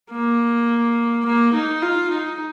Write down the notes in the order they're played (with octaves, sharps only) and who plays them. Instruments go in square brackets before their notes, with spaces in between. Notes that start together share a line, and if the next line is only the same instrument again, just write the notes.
[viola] A#3
A#3
D#4
F4
D#4